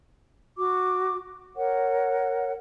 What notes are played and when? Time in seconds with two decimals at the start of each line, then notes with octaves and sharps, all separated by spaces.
0.57 F#4 D6
1.56 A#4 C#5 F#5